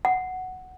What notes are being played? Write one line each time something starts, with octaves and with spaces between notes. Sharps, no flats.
F#5